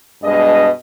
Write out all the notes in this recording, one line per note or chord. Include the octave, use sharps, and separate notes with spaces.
G2 B2 G#3 D#5